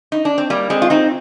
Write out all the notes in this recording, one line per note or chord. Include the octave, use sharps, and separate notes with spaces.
D#4
D4
C4
G3 A#3
G#3 C4
F4
C4 D#4